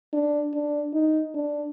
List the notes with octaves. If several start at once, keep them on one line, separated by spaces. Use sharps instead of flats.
D4
D4
D#4
D4